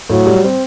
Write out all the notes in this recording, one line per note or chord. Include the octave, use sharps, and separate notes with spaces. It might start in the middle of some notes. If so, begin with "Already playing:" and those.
A2 F#3
G3
C4